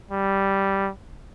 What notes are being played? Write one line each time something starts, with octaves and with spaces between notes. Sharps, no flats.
G3